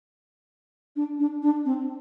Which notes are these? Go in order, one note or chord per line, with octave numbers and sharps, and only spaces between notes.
D4
D4
D4
C4